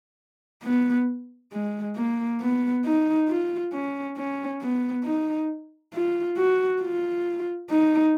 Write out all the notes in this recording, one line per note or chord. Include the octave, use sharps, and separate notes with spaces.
B3
G#3
A#3
B3
D#4
F4
C#4
C#4
B3
D#4
F4
F#4
F4
D#4